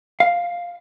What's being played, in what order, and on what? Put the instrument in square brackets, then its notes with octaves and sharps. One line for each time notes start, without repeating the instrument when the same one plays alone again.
[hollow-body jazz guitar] F5